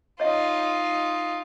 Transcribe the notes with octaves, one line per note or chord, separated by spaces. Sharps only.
D#4 F4 C#5 D#5 E5